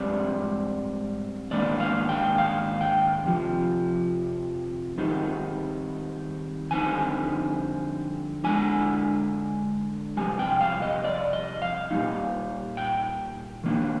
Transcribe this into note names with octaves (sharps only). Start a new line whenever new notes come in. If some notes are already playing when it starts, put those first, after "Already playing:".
Already playing: G#2 G3 C4 D5
G#2 D#3 A#3 D4 D5
F5
G5
F5
G5
F2 C3 F3
D#3 G3 C4 D#4
F2 D3 G3 C4 D#4 G#5
D3 G#3 D4 G#5
F2 C3 G3 G#5
G5
F5
D#5
D5
D#5
F5
A#2 G3 A#3 D#4
G5
D#3 A#3 D4